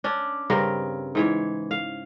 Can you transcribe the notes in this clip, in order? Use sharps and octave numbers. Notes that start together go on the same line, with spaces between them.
C#4 D4
G2 C#3 C4 A#4
G#2 E3 C#5
F5